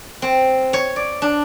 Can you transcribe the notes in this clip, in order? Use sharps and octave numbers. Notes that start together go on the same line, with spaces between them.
C4
C#5
D5
D4